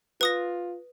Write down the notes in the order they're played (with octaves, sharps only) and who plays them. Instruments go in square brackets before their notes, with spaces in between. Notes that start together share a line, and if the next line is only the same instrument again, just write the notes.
[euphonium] F4 [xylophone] B4 D#6 A#6